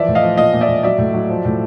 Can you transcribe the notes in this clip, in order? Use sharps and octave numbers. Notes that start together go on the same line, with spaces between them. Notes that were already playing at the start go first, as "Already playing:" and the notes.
Already playing: E3 F3 D5 E5
A2
D#5 F5
F3
A#2 D#5 F5
A#2
D5 E5
A#2
F#3 D5 E5
A2
F#3
F3
A2